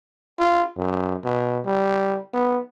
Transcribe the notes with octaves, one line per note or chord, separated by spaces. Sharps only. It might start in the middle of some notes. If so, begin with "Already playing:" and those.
F4
F#2
B2
G3
B3